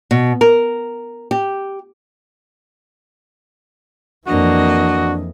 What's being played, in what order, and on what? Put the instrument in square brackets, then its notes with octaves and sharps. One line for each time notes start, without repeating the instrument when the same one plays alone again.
[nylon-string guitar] B2
A#4
G4
[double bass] F2 E3 [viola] A#3 D#5 [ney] D4 [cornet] F#4